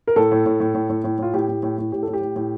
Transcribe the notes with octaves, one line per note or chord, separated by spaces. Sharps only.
A#4
A2 A4
A2
A2
A2
A2
A2
A2
A2 F4
A2 G4
A2
A2
A2
A2 G4
A2 A4
G4
A2
A2